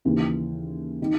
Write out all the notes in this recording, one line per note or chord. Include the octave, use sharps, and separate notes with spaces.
D#2 C#3 E3
D#3